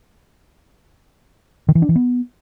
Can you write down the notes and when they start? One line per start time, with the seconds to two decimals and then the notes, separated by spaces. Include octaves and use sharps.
1.69 D#3
1.75 E3
1.82 D4
1.89 E3
1.96 B3